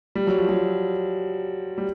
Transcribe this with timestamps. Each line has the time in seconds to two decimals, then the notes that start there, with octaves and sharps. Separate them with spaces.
0.15 G3
0.27 F#3
0.38 F3
0.49 F#3
1.78 G3